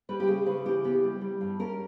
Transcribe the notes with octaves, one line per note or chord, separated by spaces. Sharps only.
G3 B4
G4
C#3 G#4
C#3 B4
E3 G4
B3 G4
G3
G3
G2
C#4 A#4